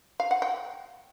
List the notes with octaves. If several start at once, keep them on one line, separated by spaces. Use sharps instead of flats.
F5
F#5
G5